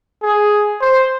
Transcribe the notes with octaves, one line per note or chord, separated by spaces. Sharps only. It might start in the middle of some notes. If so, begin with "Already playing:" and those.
G#4
C5